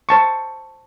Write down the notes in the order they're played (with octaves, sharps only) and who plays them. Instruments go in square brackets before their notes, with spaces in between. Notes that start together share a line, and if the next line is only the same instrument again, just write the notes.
[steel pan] C5 A5 C#6